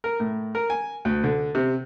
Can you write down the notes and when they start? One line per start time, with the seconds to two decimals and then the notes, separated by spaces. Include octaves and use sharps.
0.04 A#4
0.20 A2
0.55 A#4
0.70 G#5
1.05 D2
1.24 D3
1.55 C3